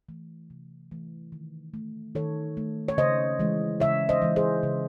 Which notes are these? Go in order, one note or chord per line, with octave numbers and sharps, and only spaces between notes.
E3 A3
C3
E3 A3
D#3
A3
D#3 A4 C#5
A3
C#5
C#3 C5 D#5
E3 G#3
C#3 C#5 E5
C5 D#5
E3 G#3
G#4 C5
C#3